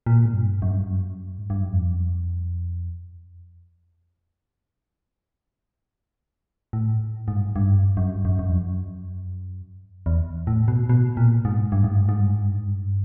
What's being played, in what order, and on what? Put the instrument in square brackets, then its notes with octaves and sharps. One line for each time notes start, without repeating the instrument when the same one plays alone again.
[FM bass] A#2
G#2
G2
F#2
G2
F#2
G#2
G2
F#2
F2
A2
G#2
G2
G#2
G2
F#2
G2
F#2
F#2
F2
F#2
E2
A2
B2
B2
A#2
G#2
G2
G#2
G2
G#2
G2
G#2
G2
G#2
G2